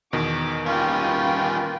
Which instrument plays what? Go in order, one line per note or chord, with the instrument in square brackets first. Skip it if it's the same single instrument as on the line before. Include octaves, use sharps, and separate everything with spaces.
[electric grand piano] E2 B2 D#3 [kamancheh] D6
[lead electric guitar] G3 C#4 [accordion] A#3 F4 [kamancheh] B4 G5